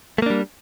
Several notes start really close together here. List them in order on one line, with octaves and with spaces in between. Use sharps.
A3 A#3 D4 G3